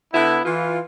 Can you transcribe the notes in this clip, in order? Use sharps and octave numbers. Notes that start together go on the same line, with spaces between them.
D3 B3 E4
E3 F4